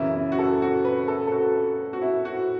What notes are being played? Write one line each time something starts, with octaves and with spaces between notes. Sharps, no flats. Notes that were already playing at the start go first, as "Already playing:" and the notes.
Already playing: F#2 C#3 E3 E4
E4
F#4
A4
F#4
B4
A4
A4
F#4
F#4
E4
F#4